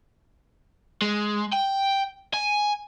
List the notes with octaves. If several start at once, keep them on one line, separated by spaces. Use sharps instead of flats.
G#3
G5
G#5